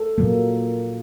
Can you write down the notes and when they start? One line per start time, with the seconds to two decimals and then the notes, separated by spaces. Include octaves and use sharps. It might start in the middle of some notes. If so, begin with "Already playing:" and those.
Already playing: A4
0.18 A#2 F#3 A#3